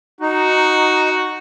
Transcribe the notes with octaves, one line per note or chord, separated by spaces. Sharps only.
D#4 F#4